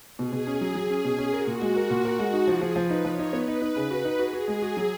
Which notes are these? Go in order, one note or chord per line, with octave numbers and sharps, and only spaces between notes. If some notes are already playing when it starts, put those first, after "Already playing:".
B2 G#4
B2
C#4
F#3
F#3
C#4
B2
C#4
F#4 A#4
A#2
G#3
A#4
A#2
A#4
G#3
D#4
F3 G#4
F3
F3 B4
D#4
F3 C#5
D#4
B3 B4
D#4
D#4
C#3
F#4
D#4
F#4 G#4
F#4
G#3
F#4
F#3